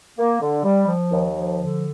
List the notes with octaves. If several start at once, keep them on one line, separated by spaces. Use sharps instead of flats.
A#3
D3
G3
F3
D#2
F3
D3